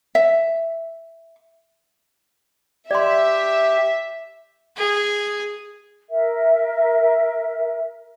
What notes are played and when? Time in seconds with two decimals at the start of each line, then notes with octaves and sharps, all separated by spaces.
0.15 E5
2.91 G4 D5 E5 C6
4.77 G#4
6.10 A#4 E5